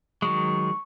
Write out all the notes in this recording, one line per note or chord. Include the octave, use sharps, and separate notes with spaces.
D#3 F#3 G#3 C#6